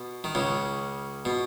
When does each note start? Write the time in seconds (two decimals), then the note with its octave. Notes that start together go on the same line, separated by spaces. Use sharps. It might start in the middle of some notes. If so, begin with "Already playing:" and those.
Already playing: B2
0.24 D#3
0.35 C#2 C#3
1.25 B2